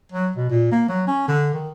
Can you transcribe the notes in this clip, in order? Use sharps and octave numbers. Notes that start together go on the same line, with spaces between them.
F#3
B2
A#2
A#3
F#3
C#4
D3
D#3